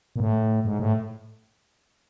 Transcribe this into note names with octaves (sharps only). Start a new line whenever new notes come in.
A#2
A2
G#2
A2